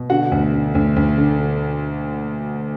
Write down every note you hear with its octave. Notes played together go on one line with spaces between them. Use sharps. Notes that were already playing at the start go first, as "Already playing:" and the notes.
Already playing: B2
D3 F#4 F#5
D2
D3
D2
D2
D3